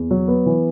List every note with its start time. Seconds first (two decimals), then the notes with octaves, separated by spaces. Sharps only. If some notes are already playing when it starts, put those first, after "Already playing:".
Already playing: E2
0.11 F#3
0.28 B3
0.46 E3